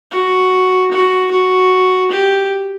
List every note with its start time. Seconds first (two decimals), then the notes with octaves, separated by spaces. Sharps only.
0.11 F#4
0.92 F#4
1.31 F#4
2.11 G4